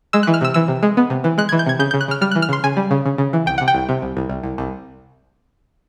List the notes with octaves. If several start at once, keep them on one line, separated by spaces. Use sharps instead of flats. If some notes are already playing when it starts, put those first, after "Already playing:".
G#3 E6
F#6
E3
F6
C3 E6
E3 E6
C3
G#3
B3
C3
E3
G#3 F#6
G#6
E3
G6
C3 G#6
C#3 G6
G6
C#3
F#6
C#3 F6
G3 F6
F#6
E3
F6
C#3 C6
C#3 G#5
G3
C#3
C#3
C#3
E3
C2 G5
C3 F#5
G5
C2
C3
C2
C2
C2
C2
C2